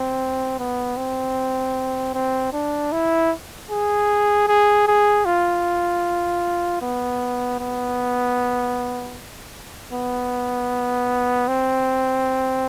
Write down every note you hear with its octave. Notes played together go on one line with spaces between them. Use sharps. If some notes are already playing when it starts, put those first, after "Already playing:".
Already playing: C4
B3
C4
C4
D4
E4
G#4
G#4
G#4
F4
B3
B3
B3
C4